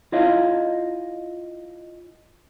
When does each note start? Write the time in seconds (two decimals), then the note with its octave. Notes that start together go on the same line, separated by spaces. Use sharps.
0.12 E4 F4 C#5 D#5 F5